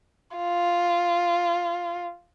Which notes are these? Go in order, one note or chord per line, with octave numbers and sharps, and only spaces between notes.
F4